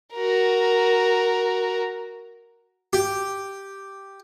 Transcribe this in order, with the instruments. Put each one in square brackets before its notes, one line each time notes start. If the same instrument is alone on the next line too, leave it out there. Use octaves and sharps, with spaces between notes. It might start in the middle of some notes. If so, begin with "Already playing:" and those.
[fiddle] F#4 A#4
[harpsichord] G4